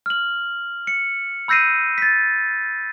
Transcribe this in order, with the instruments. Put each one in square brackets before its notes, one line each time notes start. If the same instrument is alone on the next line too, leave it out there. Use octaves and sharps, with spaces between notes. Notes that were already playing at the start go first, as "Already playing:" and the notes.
[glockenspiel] F6 F#7
C#7
B5 E6 G6 A#6 C7 D#7
A6 B6